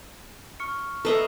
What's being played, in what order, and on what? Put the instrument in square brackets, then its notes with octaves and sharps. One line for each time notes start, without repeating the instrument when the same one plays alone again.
[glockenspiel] C#6 F6 C#7
[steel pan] A4 [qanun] B4 D#5 E5 [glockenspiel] A#5 C7 F7